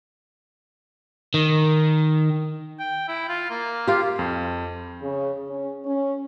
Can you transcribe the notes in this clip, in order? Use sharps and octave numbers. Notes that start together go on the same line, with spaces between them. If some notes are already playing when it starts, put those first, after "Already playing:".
D#3
G5
E4
F4
A#3
F4 G4
F2
C#3
C#4
C#4